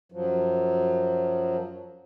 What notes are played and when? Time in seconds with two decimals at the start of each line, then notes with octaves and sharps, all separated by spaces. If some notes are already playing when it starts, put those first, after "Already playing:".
0.12 F#2 F3 F#3